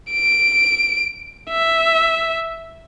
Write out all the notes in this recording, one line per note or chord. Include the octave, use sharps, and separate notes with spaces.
D7
E5